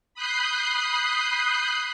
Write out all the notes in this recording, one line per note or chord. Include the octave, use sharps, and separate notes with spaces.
B5 D#6 F#6 G6 C7